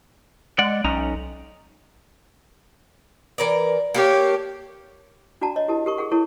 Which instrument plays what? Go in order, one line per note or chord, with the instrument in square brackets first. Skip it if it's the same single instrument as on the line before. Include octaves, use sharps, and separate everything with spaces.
[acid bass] G#3 [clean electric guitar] D5 F#5
[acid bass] B1 [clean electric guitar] C#4 D#4 A#5
[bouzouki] E3 A#4 D5
[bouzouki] A#3 A4 C#5 [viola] G4
[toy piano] D4 F#4 D5 F#5 A5 A#5
C#5 D#5
E4 G4 A#4 A5
G4 A#4 C#6
G#4 A#4 F#5 C#6
E4 A4 A#4 C#5 F#5 C#6